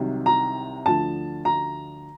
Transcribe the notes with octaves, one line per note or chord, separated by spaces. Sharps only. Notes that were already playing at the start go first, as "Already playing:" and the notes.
Already playing: C2 C3 D#3 F#3
A#5
D2 D3 F3 A5
A#5